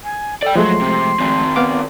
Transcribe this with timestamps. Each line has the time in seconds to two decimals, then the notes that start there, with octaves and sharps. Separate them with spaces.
0.03 G#5
0.43 A4 D5 G5
0.56 F3 F#3 G#3 A3 C6
0.81 C3
1.20 D#3 C4
1.56 B3 F5 D6